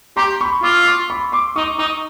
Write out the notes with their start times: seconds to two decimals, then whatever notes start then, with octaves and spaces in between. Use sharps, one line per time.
0.17 G4 A#5 C6
0.41 B5 C#6
0.63 F4 D6 E6
0.76 C#6
0.86 C6 D6
1.10 B5 C#6
1.32 C6 D6
1.56 D#4 C#6 D#6
1.79 D#4 C#6 D#6